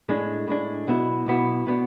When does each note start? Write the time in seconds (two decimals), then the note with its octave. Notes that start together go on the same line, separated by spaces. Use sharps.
0.09 A2 G#3 D4
0.48 A2 G#3 D4
0.87 B1 B2 B3 E4
1.26 B1 B2 B3 E4
1.67 B2 B3 D4